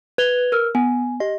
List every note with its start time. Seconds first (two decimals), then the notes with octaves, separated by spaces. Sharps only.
0.18 B4 G#6 F7 G7
0.52 A#4 E6 F6
0.75 B3 G#5
1.20 G4 D#5